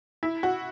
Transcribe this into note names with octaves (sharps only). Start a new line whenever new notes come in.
E4
F#4